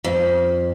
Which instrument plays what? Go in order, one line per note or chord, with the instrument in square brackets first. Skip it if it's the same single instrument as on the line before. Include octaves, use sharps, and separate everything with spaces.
[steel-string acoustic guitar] F2